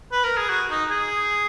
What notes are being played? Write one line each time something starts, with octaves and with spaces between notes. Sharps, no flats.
B4
A#4
G#4
F#4
D#4
G#4